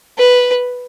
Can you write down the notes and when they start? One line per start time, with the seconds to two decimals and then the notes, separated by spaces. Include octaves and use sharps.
0.18 B4